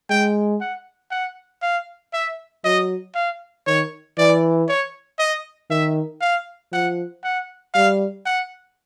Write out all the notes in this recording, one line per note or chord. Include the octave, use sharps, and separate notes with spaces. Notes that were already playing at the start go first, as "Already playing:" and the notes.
G#3 G5
F#5
F#5
F5
E5
F#3 D#5
F5
D#3 C#5
E3 D5
C#5
D#5
D#3 E5
F5
F3 F#5
F#5
G3 F5
F#5